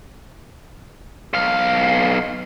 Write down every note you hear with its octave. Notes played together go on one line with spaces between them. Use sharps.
B1 F5